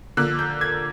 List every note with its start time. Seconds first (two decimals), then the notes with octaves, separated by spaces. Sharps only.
0.17 D3 F3 A#3 F#6
0.39 G6
0.61 G#6